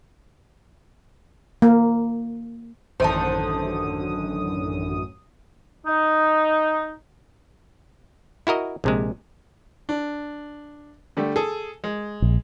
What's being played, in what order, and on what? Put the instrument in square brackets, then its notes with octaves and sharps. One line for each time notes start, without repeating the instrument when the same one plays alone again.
[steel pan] A#3
[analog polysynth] A1 F#2 D#6 [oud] D3 D#3 [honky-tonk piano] C5 A5
[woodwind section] D#4
[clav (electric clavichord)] E4 F#4 A#4 D#5
A#1 C3 G#3
[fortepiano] D4
D3 G3 A3
G#4 A4
G#3
[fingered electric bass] A#1